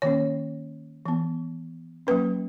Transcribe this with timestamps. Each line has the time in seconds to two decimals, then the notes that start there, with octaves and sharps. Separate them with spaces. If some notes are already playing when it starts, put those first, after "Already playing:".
0.02 D#3 A#3 C#4 C#5
1.06 E3 B3
2.07 F#3 A#3 C#4 B4